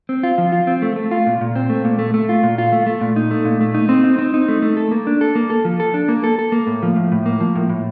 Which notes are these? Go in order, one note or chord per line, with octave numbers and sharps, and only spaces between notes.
C4
F4
F3
F4
C4
A3
A3
F4
A#2
A#2
C4
A3
A#2
A3
A3
F4
A#2
F4
A3
A3
A#2
D#4
A3
A#2
A3
D#4
C4
D#4
C4
D#4
A3
A3
A4
A#3
D4
A4
A#3
A4
F3
A4
D4
A#3
A4
A4
A#3
A2
F3
A2
A2
A#3
F3
A2
A2